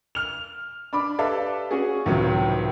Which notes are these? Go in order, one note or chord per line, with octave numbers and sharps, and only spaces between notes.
F6 F7
D4 B5 D6
G4 A4 B4 D5 E5 F5
C#4 F#4 G#4
C#2 A2 C3 D#3 F#3